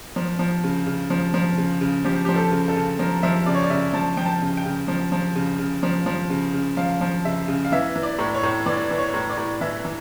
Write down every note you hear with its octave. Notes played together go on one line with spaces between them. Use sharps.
F3
F3
C#3
C#3
F3
F3
C#3
C#3
F3 G4
F3 G4
A4
C#3
A4
C#3
F3 A#4
F3 E5
C#3 D5
C#5
D5
C#3 E5
F3 A5
F3 G5
A5
C#3
G5
C#3
F3
F3
C#3
C#3
F3
F3
C#3
C#3
F3 F5
F3
C#3 E5
C#3
F5
E3 E5
E3
D5
A2
C#5
A2
E3 D5
E3
C#5
A2
D5
A2
E3 E5
E3